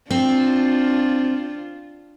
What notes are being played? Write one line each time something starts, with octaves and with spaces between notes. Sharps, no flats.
C4 D4 F4